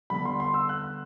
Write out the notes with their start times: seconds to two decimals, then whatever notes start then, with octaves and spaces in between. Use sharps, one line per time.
0.10 D3 G3 B3 B5
0.25 C6
0.40 C6
0.54 E6
0.69 F#6